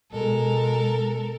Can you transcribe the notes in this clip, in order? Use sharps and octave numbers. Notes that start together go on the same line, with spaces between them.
B2 G#3 A4 A#4